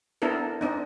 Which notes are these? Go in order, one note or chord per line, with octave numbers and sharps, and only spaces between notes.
B3 D4 E4 A4 A#4
C4 D4 D#4